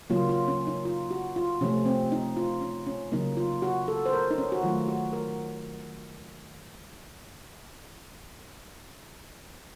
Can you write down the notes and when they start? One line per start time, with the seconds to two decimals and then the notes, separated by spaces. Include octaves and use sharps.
0.10 C#3 F#3 A#3 F4
0.29 F4
0.48 C#4
0.67 D#4
0.85 F4
1.11 F#4
1.36 F4
1.61 C3 F3 A3 C#4
1.86 C4
2.12 D#4
2.37 F4
2.62 C#4
2.87 C#4
3.12 C#3 F#3 A#3 D#4
3.37 F4
3.62 F#4
3.88 A4
4.06 C5
4.13 A#4
4.31 D#4
4.38 C#4
4.52 F#4
4.63 D#3 F#3 A3 F4
4.88 F#4
5.13 A#4